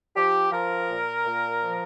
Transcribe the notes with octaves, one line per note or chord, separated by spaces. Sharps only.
F3 G4
F3 A#4
A#2
A#2
F3